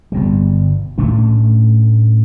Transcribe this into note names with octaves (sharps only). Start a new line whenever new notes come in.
G1 B2 G3
A2 A3 C#4 D4